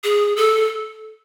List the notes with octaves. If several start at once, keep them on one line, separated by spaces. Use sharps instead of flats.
G#4
A4